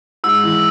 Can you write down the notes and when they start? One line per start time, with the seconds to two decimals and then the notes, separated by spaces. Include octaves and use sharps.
0.24 G#2 E6
0.43 E3